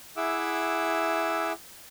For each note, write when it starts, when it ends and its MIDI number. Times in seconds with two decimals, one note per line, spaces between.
0.17 1.53 64
0.17 1.53 68
0.17 1.53 76
0.17 1.53 78
0.17 1.53 86
0.17 1.53 88